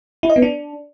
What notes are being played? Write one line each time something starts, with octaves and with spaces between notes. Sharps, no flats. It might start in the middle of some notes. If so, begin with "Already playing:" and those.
E4
D#5
B3
D4